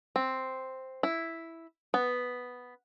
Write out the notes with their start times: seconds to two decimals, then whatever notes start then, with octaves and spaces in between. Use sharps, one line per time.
0.16 C4
1.03 E4
1.94 B3